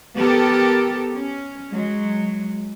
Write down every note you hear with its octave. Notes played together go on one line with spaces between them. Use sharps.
B3 G4 A4 A#4
C#4
F#3 G#3